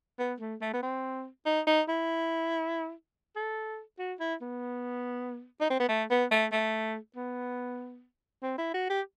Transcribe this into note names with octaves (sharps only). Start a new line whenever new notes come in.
B3
A3
A3
B3
C4
D#4
D#4
E4
A4
F#4
E4
B3
D#4
C4
B3
A3
B3
A3
A3
B3
C4
E4
F#4
G4